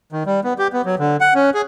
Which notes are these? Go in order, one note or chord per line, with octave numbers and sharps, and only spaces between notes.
D#3
G3
B3
G4
B3
F#3
D3
F#5
C#4
G#4